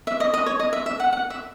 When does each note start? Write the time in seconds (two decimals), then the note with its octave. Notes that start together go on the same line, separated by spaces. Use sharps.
0.07 E5
0.20 D#5
0.34 D#5
0.46 C#5
0.60 D#5
0.73 E5
0.86 E5
1.00 F#5
1.13 F#5
1.30 E5